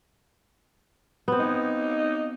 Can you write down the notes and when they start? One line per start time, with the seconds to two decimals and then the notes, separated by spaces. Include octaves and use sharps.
1.28 B3 C4
1.39 D#4